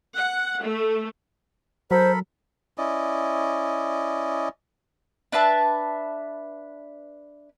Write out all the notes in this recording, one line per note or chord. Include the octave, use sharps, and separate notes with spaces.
F#5
A3
F#3 A4 A#4 C5 B5
C#4 E4 D5 D#5
D4 B4 E5 A5